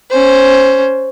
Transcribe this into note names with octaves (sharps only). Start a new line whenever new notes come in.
C#4 C5